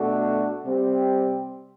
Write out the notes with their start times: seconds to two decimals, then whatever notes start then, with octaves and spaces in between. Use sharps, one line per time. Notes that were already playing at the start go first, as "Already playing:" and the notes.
Already playing: B2 A3 D4 F#4 A4
0.64 C3 G3 C4 G4